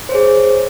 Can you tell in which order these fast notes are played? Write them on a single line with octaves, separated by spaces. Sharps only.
C5 C#5 G#4